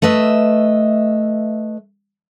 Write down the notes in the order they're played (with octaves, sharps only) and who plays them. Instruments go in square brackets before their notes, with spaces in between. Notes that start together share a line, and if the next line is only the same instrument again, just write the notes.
[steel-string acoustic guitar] A3 B4 D#5 E5